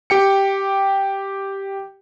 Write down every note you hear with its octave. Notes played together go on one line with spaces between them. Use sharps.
G4 G5 C#7